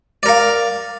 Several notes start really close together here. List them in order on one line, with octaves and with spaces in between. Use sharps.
D5 A#4 F5